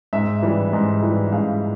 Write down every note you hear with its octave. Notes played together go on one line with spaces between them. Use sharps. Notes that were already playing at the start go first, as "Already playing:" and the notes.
G#2 E5
E3 G3
G#2
E3 G3
G#2 F5